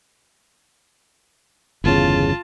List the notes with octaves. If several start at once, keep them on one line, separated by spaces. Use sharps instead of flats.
G1 E2 C#3 F4 A5